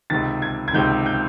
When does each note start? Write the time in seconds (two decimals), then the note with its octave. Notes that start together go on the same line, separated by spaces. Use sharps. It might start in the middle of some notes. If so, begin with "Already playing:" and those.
0.10 C#2 C3 D#3 A6
0.42 G#6
0.68 G#6
0.73 C#2 C3 D#3 G6
1.06 G6